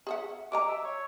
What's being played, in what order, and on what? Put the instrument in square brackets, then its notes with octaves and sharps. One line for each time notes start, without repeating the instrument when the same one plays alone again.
[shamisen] G#4 E5 F#5
[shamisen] G3 D#5 A#5 [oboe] D6
[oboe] E5
C#5